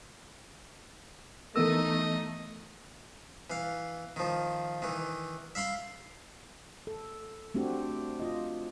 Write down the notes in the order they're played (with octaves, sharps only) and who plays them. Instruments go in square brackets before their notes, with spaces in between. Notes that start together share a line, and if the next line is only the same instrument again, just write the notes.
[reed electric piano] E3 B3 E6 [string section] A3 D#4 [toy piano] A4 A#4 [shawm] D#5
[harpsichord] E3 F5
D#3 F3
D#3 E3
E5 F5 B5 C6
[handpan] A4
A3 C4 D4 F#4 G4
F4 D#5